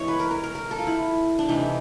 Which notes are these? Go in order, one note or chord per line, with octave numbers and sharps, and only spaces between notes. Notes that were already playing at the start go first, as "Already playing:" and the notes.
Already playing: E3 G#3 B3 C#5
B4
A#4
A#4
A#4
A#4
A4
F4
E4
D4
C3 E3 A3 D#4